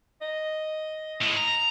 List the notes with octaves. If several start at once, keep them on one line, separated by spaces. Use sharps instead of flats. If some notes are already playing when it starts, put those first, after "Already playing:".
D#5
A2 G#3
A#5